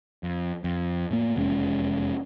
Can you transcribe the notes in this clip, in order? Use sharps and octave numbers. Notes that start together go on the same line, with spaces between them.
F2
F2
A2 A#3
F1 E2 G#3 C#4